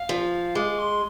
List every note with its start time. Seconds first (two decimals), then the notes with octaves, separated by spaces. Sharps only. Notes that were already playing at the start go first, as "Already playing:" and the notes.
Already playing: F5
0.09 F3
0.55 G#3 D6
0.79 C6